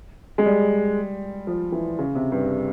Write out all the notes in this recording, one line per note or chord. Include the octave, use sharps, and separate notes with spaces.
G#3
G3
F3
E3
C#3
C3
G2